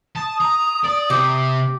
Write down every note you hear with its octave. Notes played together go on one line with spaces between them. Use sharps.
A5 D#6
A#5
D5
C3 G4